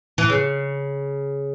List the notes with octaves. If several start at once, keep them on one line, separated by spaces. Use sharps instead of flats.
E3
C#3